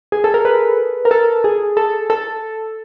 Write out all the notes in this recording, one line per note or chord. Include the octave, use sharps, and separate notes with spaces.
G#4
A4
A#4
B4
A#4
A4
G#4
A4
A4